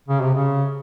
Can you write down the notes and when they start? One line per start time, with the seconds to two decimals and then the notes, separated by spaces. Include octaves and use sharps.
0.09 C#3
0.21 C3
0.34 C#3